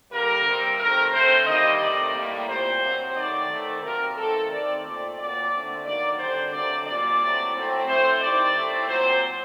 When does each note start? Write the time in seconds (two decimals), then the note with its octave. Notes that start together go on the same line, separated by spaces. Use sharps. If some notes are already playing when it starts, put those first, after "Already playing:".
0.11 D3 G3 A#3 A#4
0.45 C3 G3 C4
0.79 C3 D#3 A3 C4 A#4
1.13 D3 A3 C4 C5
1.46 D#3 G3 A#3 D#5
1.80 C3 D#3 A3 D5
2.14 A2 G3 A#3
2.48 A#2 G3 C4 C5
2.81 C3 F#3 C4
3.15 D#3 F#3 A3 D5
3.49 D#3 A3 C4
3.82 C3 F#3 A#3 A#4
4.17 C3 D#3 A3 C4 A4
4.50 D#3 A3 C4 D5
4.84 A#2 A3 C4 D5
5.17 A#2 F#3 A#3 D5
5.51 D3 A3 C4
5.85 D#3 F#3 A#3 D5
6.19 D3 G3 C4 C5
6.53 D3 F#3 A3 C4 D5
6.86 A#2 G3 A#3 D5
7.20 A2 F#3 A3 C4
7.54 A2 F#3 A3 C4
7.87 A2 A3 C4 C5
8.21 D#3 G3 C4 D5
8.55 A2 A3 C4
8.88 A#2 F#3 C4 C5